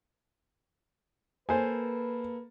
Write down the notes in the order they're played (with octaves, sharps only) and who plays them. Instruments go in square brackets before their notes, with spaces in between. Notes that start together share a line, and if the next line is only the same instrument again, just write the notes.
[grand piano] A#3 A4 [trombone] B4 [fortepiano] C5 G#5